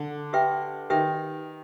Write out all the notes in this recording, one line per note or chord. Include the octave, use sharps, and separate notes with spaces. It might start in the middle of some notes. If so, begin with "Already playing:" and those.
Already playing: D3
G4 B4 E5 G5
D#3 G4 B4 E5 G5